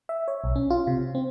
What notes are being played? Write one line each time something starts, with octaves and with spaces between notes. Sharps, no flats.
E5
C#5
B1
C#4
F4
C3
C4